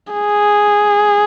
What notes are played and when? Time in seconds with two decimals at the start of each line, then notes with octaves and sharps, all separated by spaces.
0.13 G#4